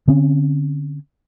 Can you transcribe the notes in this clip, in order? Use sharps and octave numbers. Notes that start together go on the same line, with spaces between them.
D3 C4 C#4